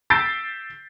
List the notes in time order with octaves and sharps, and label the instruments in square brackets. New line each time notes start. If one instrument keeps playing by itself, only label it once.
[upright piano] E6 G6 A6 B6 C7 D7